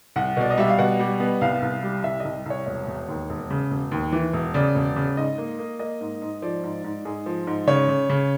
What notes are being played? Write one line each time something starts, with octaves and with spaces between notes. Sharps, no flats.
C2 F#5
B2 D5
D#5
G3 E5
F5
B2 F#5
G3
B3
C2 F5
C2
G3
C2 E5
C2 D#5
C2 C#5
E1 C#5
E1
D#2
E1
C#3
E1
D#2
E3
E1
C#3 D5
E1
C#3
G#2 D#5
A#3
A#3
A#3 D#5
G#2
G#2
F3 D5
G#2
G#2
G#2 G#4
F3
G#2
C#3 C#5
C#3
C#3